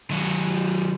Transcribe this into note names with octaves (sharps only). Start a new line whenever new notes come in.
D#3 F#3